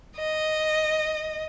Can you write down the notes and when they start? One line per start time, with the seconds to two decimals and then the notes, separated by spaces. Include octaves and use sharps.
0.17 D#5